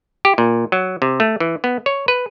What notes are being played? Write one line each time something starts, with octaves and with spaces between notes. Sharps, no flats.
G4
A#2
F#3
C3
A3
E3
B3
C#5
B4